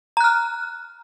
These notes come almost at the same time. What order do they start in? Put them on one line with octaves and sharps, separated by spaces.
A#5 F#6 F6